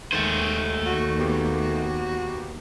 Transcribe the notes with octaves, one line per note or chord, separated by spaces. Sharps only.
D#2 D#3 G#3 A3 C5 A6
F#4
A#3 B3 G4